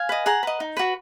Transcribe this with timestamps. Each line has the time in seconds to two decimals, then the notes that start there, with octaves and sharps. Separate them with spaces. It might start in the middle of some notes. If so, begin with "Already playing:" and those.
Already playing: F5 G#5
0.09 B4 D#5
0.26 G#4 F#5 A#5
0.43 B4 D#5
0.60 D#4
0.77 F#4 B4